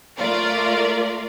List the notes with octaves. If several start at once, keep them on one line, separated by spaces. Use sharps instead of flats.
A3 F4 A#4 D5